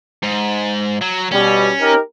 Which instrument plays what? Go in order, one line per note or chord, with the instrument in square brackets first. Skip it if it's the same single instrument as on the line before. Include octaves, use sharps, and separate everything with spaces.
[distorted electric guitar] G#2
F#3
[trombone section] B2 G3 [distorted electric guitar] C#4
[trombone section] D#4 G4 A#4